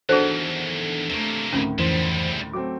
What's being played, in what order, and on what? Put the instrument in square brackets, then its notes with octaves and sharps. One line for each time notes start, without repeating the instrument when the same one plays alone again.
[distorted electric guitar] E2 D#3 [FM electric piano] D4 A4 [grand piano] F#4 A#6 [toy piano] G#4 C5
[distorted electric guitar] C3 A#3 [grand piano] A3 G7
[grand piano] D2 A2 D#3 [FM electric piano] C4 [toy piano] C#4
[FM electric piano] F2 E3 C5 [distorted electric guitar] C#3 G3
[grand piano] F#3 A3 C4 [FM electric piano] D6